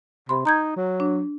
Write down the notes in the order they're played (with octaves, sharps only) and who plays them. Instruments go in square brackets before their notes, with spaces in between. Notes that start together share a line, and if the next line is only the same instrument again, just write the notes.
[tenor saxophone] C3 [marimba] B5 C6
[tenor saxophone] D#4 [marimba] A#5 G6 G#6
[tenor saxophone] F#3
[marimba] D4